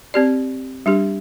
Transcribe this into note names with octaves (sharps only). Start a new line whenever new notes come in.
C4 G4 D5
G3 D4 G4